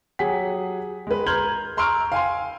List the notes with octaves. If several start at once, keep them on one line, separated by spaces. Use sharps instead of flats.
F#3 G4 G#4 F#5 G#5 B6
G#3 B4
A#5 C6 F6 G6 G#6 F#7
A#5 C6 C#6 E6 F6 D7
F5 G#5 C6